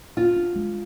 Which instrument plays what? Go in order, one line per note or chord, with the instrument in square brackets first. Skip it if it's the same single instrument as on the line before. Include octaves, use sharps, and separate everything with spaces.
[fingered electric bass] D4 [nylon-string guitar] F4
[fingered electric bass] D4
G#3